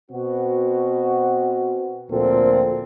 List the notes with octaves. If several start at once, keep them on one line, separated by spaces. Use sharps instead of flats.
B2 C4 F#4
D2 A#2 F3 C4 A4